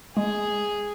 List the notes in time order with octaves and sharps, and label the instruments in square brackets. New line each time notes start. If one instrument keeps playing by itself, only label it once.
[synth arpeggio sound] G#3 [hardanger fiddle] G#4